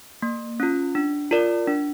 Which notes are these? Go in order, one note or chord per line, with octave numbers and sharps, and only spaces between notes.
A#3
C#4 F4
D4
F4 A#4 D5
D4